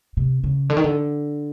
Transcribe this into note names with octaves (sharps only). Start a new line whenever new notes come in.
C3
C#3
D3
D#3
D3